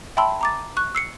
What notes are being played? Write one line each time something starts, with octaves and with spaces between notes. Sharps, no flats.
E5 G5 A5 B5 C6 E6
A#5 D6 A6
C#6 F#6
E6 C7 C#7